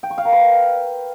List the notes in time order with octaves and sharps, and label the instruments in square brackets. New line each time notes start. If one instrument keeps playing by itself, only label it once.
[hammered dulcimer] G5
C#6
F5
A#4
B4